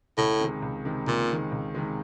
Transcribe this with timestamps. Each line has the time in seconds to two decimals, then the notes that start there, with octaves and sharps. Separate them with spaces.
0.18 C#2 A2
0.40 C3 D#3 G#3
0.62 C#2
0.85 C3 D#3 G#3
1.07 C#2 A#2
1.29 C3 D#3 G#3
1.52 C#2
1.75 C3 D#3 G#3